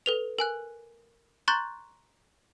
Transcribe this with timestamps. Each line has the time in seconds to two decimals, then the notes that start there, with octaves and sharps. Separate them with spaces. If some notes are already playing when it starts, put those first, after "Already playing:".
0.06 A4 B4 F7
0.39 A#4 G#5 F#6
1.48 A#5 C6 C#6 F#6 G6 A6